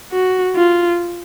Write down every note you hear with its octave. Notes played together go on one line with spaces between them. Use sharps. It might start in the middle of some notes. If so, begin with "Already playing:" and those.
F#4
F4